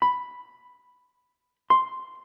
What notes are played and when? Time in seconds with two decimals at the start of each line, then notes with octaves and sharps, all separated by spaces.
0.02 B5
1.70 C6